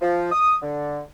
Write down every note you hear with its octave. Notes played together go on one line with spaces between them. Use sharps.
F3
D#6
D3